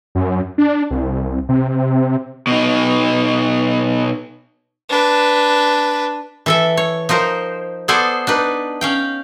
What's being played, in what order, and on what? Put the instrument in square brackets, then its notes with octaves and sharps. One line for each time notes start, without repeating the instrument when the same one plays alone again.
[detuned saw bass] F#2
D4
C2
C3
[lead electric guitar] B2 D#4
[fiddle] D4 B4
[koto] E3 A4 E5
C#5
F3 D#4 A#4 C5
B3 G#4 A4 C5 D5 G#5
D4 D#4 B4
C#4 F5 G5